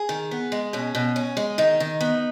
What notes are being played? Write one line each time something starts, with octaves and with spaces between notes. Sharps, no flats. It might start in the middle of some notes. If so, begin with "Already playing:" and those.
Already playing: G#4
D#3
B3
G#3
B2 C#4
B2
C#4
G#3
D#3 D#4
D#3
B3